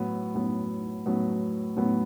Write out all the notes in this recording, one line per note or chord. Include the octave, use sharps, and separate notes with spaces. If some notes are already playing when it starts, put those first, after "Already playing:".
Already playing: A2 F#3 B3
A2 F#3 B3
A2 F#3 B3
A2 F#3 B3